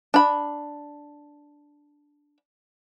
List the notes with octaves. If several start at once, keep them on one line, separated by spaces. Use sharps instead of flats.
D4 B5